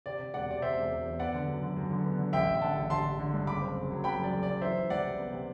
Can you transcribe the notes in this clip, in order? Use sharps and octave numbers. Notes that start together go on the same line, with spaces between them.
C3 D5
C3
E1 D5 F#5
C3 D5
C3 C5 E5
E1
E1
E2
B3 D5 F#5
D3
F#2
D3
F#2
D3
B3
D3
A1 E5 G5
A1
G5
D3 F#5 A5
A1
D3 A5 C6
D3
D3
G2
F#1 B5 D6
C4
F#1
F#3
F#3 G5 B5
F#2 D5
F#1
F#3 D5
E3 C5 E5
E3
C2 D5 F#5
C3
B3
C3